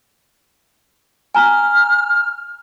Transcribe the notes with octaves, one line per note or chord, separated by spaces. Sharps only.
G#5 A#5 F6